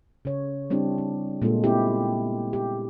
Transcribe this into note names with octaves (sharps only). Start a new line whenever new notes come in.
C#3 C#5
G3 C4 D4 E4 G4
C4
A#2 G#3 A#3 F4 A4
B3 C4 E4 G4
G4